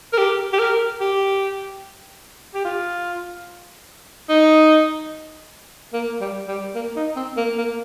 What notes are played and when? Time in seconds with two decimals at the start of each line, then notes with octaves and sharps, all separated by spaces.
0.13 A#4
0.18 G4
0.53 G4
0.59 A#4
1.00 G4
2.54 G4
2.65 F4
4.29 D#4
5.93 A#3
6.21 G3
6.48 G3
6.75 A#3
6.96 D#4
7.16 C4
7.37 A#3
7.58 A#3